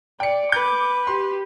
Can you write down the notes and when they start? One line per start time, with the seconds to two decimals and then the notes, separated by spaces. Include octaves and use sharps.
0.20 D5 G5 C#7
0.52 B4 D6 G6
1.07 G4 C6